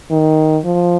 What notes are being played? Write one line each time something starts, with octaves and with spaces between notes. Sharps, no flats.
D#3
F3